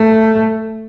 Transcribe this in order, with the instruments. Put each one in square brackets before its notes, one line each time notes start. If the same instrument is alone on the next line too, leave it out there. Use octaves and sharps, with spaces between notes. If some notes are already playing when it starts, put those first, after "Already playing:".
Already playing: [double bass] A3